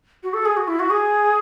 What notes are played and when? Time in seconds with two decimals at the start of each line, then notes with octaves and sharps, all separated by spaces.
0.23 F#4
0.34 A4
0.45 G#4
0.57 F#4
0.68 E4
0.79 F#4
0.90 G#4